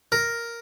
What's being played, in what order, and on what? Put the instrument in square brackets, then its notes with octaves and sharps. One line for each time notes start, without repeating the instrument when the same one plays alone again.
[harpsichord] A#4